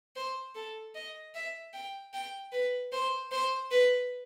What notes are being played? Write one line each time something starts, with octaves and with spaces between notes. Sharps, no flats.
C5
A4
D#5
E5
G5
G5
B4
C5
C5
B4